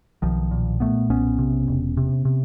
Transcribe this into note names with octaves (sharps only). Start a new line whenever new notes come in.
B1 D#3 F3
A#2
A#2 A3 B3
B1 B3 C#4
C3
E1
C3
C3